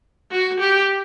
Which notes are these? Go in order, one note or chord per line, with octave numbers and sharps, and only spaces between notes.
F#4
G4